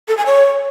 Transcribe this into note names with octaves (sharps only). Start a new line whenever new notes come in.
A4
G#5
C#5